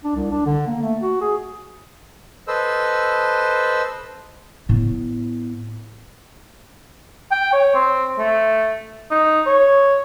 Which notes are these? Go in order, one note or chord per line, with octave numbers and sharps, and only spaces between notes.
D4
C2
D4
D3
A#3
A3
F#4
G#4
A4 B4 C5 D#5 E6
A2 B3
G5
C#5
C4
A3
D#4
C#5